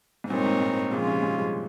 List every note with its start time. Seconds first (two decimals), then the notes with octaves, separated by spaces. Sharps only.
0.24 G#2
0.30 G2 A#2 G#3 C4 D#4 A#4 C#5
0.46 G#2
0.53 A#2
0.61 G#2
0.91 A#2 C#3 F3 G#3 C#4 F4
1.07 G#2 C3
1.22 G#2 C3
1.38 G2 A#2